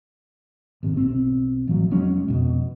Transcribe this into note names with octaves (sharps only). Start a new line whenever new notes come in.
G#1 C3
B1 C4
A1 F3 F#3
F1 F#3 G#3 C#4
F2 B2